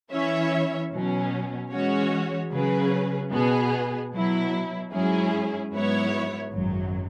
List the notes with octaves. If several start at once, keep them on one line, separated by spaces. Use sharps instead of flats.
E3 C#4 E4 C#5 E5
B2 F#3 C#4
E3 G#3 C#4 F#4 C#5
C#3 F#3 C#4 G#4 B4
B2 B3 G#4
B2 F#3 E4
G#2 F#3 C#4 E4 G#4
G#2 F#3 B3 E4 C#5
G#1 F#2 F#3